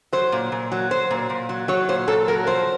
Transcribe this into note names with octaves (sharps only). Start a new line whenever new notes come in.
F#3 C5
A#2
A#2
F#3
F#3 C5
A#2
A#2
F#3
F#3 C#5
A#2 C5
A#2 A4
F#3 A#4
F3 C5